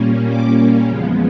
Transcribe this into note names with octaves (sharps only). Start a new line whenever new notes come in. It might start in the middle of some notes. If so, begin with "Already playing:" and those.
Already playing: A#2 G3 A#3 C#4
D6
E2 C#3 F3 G#3 B3